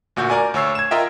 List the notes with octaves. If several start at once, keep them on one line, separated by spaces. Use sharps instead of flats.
D2 A#2 F#4 G6
A#4 D5 G#5
D2 C#5 E6 C7
G#6 E7
F4 A#4 D#5 E5 G5